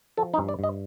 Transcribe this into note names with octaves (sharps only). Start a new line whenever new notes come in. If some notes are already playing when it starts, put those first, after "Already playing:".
F3 A4
D#4
G2
D5
G2 D#5